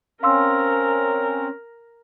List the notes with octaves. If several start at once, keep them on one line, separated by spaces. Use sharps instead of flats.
C4 C#4 A#4 F5 C6 E6